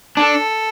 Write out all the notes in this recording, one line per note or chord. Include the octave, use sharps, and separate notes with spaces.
D4 A4